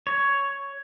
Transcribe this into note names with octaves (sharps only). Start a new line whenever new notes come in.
C#5